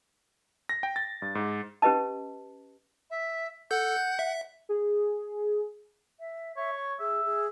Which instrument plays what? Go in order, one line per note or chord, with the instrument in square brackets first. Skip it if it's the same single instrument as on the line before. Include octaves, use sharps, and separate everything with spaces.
[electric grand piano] A#6
G5
A6
G2
G#2
[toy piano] C#4 G4 B4 D#5 A5
[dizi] E5
[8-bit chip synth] A4 G6 [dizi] F#5
[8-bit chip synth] G6
E5
[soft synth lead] G#4
[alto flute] E5
[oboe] C#5 [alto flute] E5
[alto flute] C#6
[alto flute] G#4 [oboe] E5
[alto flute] G#4